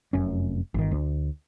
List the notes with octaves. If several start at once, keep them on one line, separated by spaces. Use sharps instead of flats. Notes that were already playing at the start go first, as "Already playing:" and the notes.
F1 F#2 C#4
G1 D#3
D2